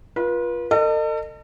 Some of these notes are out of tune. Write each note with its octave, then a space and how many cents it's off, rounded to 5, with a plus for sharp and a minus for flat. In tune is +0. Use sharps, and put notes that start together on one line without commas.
F4 +0 B4 -35
A4 +40 D#5 -30